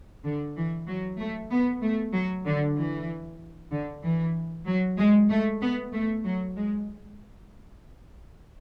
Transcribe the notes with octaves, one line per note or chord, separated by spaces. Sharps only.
D3
E3
F#3
A3
B3
A3
F#3
D3
E3
D3
E3
F#3
G#3
A3
B3
A3
F#3
G#3